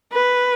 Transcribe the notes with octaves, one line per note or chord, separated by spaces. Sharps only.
B4